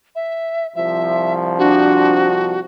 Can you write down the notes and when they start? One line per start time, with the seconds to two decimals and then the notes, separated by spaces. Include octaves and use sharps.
0.15 E5
0.76 C2 F3 E5
1.59 D4 F#4